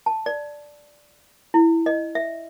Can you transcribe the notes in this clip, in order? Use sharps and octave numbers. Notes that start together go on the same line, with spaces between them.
A5
D5
E4
D#5
E5